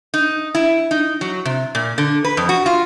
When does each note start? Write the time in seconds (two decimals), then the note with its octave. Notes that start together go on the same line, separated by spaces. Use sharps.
0.14 D#4
0.55 E4
0.91 D#4
1.21 F#3
1.45 C3
1.75 A#2
1.98 D3
2.24 B4
2.37 F2
2.49 F#4
2.66 F4